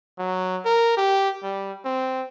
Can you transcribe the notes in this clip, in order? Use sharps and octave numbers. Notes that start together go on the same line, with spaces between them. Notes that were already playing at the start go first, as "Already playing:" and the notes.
F#3
A#4
G4
G3
C4